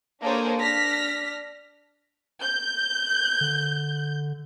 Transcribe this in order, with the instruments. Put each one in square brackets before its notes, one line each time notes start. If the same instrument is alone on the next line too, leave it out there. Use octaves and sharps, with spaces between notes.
[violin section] A#3 D4 G#4 A4 C5 C#5
D4 F6 A#6 B6
G6
[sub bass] D3